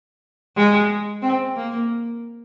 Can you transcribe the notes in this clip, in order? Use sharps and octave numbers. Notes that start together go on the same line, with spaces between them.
G#3
C4
A#3